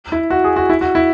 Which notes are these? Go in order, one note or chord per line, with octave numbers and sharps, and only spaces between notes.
E4
F#4
G#4
F#4
E4
F#4
E4